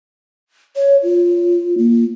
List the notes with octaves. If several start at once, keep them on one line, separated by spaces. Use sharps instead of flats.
C#5
F4
A#3